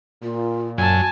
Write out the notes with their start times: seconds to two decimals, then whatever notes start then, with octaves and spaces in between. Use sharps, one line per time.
0.23 A#2 F4
0.78 F#2 F#4 G#5 A5